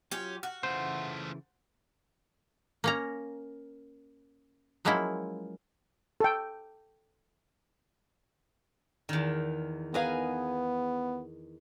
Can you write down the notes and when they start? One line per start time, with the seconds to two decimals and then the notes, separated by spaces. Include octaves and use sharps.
0.11 F#3 C#4 F4 G4
0.43 F#4 F6
0.63 C#3 E3 A3 F4 C5
2.84 A#3 C#4 A#5
4.85 F3 F#3 G#3 A#3 C#4 E4
6.20 A4 G5
9.09 E2 D#3
9.94 D#3 B3 G#4 B4 F5 G#5 A#5